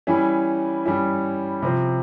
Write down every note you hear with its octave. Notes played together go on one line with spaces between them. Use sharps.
E3 G3 C#4 E4
E3 G3 C#4 E4
C3 F3 C4